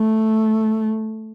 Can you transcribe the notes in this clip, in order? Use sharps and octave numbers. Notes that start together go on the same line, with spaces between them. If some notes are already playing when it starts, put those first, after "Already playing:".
Already playing: A3